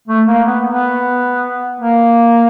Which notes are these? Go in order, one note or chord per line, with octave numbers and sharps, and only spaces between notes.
A3
A#3
B3
B3
A#3